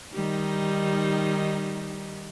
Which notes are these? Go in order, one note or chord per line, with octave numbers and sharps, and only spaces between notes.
D#3 G3 D#4